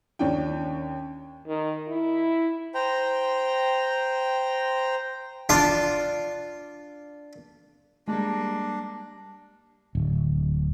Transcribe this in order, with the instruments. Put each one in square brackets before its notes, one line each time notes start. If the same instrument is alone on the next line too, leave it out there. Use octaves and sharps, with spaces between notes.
[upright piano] D#2 C#4 D4 G5
[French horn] D#3
E4
[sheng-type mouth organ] C5 G5 A#5
[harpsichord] D4 F4 D6
[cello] G3 A#3 [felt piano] G#3 [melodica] D4
[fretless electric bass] D1